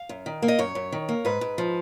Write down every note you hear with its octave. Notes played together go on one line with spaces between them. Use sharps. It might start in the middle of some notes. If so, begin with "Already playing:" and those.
Already playing: F5
F#2
D#3
A#3
D#5
F#2 C#5
F#2
D#3
A#3
G#2 B4
G#2
F3